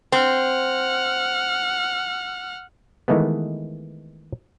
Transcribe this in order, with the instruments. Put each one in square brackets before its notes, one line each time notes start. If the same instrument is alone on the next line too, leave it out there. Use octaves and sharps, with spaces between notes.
[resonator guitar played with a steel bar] C4 [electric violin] F#5 F6
[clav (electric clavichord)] D#3 E3 G#3 A3 B3